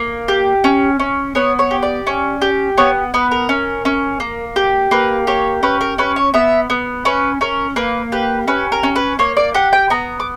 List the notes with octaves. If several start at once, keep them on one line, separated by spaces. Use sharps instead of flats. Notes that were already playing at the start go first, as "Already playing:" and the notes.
Already playing: A#3
G4
C#4
C#4
B3 C#5
C#5
G4
D5
C#4
G4
B3 C#5
B3 B4
A#4
C#4
C#4
A#3
G4
A#3 B4
G4 C#5
C#4 B4
A#4
C#4 B4
C#5
B3 E5
B3
C#4 B4
C#4 A#4
A#3 B4
G4 B4
C#4 B4
A#4
C#4
B4
A#3 C#5
D5
G4 F#5
G5
B3 A#5
D6